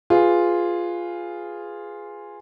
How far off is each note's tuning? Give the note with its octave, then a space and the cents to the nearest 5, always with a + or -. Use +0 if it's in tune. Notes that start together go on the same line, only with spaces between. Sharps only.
F4 +0 G#4 -5 B4 +0